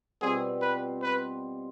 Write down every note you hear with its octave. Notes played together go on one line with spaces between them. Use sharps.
B2 G3 C4 F4 G#4
B4
B4